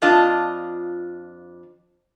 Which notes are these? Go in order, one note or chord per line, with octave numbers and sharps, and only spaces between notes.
F2 D4 F4 D#5 A5